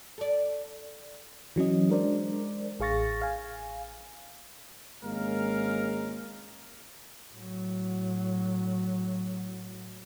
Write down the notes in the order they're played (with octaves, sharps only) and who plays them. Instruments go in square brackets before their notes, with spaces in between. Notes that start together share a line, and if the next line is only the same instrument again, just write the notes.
[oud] A4 D5
[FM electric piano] E3 F#3 C#4 D#5
G#3 D4 A#4 C5 D5
A1 G#4 F5 C#6 A6 A#6
F5 G#5
[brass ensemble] G#1 G#3 A#3 C#4 A#4 F5
[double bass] A2 F#3